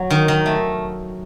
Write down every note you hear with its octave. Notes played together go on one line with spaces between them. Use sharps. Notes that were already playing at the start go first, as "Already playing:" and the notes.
Already playing: F#3
D#3
D#3
A3